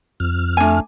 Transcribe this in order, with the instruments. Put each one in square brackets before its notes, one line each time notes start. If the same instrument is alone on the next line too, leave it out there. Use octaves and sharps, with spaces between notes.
[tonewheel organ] F2 F6
[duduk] A3 [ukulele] D4 G#5